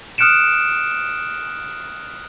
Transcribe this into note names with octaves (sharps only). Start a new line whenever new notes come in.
D#6 F6 F#6 C#7 D7 E7